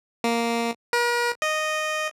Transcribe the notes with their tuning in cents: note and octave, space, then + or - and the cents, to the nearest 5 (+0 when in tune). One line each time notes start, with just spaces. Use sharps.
A#3 +0
A#4 +45
D#5 -10